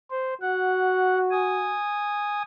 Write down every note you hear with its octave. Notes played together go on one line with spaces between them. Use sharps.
C5
F#4 F#5
G#5 D#6